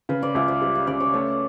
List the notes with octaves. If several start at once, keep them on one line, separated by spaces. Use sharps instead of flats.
C#3 B4
D5
C#2 E5
D5
G3 D5
D5
C#3 D5
C#5
A3 D5